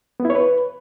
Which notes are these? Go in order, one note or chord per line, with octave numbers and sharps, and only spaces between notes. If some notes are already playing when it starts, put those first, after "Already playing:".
B3
E4
C#5
B4